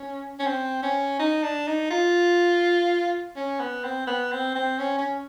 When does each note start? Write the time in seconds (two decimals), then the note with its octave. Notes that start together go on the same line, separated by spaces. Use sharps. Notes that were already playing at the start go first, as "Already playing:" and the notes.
Already playing: C#4
0.39 C#4
0.47 C4
0.83 C#4
1.19 D#4
1.44 D4
1.67 D#4
1.91 F4
3.36 C#4
3.60 B3
3.84 C4
4.07 B3
4.32 C4
4.55 C4
4.79 C#4
4.98 C#4